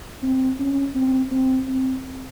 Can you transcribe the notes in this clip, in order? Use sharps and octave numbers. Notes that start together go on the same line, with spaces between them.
C4
C#4
C4
C4
C4